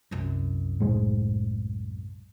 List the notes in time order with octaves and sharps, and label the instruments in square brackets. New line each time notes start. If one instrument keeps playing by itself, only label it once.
[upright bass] C2 F#2
[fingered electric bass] A2 G#3